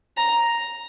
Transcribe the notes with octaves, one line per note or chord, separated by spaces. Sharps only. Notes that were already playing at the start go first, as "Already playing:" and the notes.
A#5